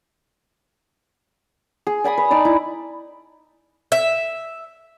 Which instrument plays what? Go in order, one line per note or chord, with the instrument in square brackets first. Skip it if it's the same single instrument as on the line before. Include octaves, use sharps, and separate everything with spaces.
[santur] G#4
D5 G#5 B5 D#6
B4
D#4 D5 A5 D6
E4
[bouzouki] E5